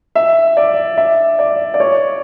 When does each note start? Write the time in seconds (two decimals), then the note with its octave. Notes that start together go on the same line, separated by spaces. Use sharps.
0.15 E5
0.57 D5
0.98 E5
1.39 D5
1.74 D5
1.80 C#5